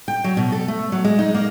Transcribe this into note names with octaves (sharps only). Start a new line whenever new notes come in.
G5
F#3
B2
A4
A3
F#3
G#3
D#4
A#3